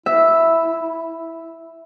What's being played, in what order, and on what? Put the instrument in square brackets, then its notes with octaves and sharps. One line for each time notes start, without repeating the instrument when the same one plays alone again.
[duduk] E4 [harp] E5